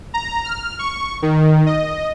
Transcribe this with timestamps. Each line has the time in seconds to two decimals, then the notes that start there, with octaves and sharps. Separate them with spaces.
0.14 A#5
0.44 F6
0.79 C#6
1.22 D#3
1.66 D#5